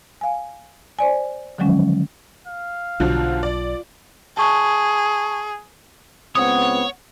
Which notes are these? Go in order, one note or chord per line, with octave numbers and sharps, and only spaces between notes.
F5 G#5
C5 D5 G#5
D3 D#3 F3 F#3 G#3 C#4
F5
B1 D3 F3 F#3 F4
D5
G#4 A5 C#6
C#2 B3 C4 C#5 F#5 D#6